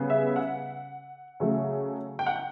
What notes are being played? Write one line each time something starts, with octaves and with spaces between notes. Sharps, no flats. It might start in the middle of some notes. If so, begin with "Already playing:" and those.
Already playing: C#3 G3 B3
E5
F#5
C#3 F#3 A3
G5
F#5
G5